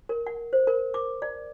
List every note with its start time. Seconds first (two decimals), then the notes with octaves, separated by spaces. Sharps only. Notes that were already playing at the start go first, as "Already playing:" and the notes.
0.09 A#4
0.27 F#5
0.53 C5
0.67 A#4
0.94 D6
1.22 D5